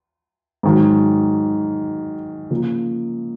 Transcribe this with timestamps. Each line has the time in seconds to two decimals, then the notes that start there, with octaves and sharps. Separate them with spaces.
0.63 G#2 D#3 F#3
2.50 C#3 F3 A#3